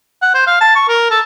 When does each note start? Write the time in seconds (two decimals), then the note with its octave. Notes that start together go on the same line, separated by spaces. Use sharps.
0.22 F#5
0.34 C5
0.47 F5
0.61 A5
0.75 C#6
0.88 A#4
1.11 A4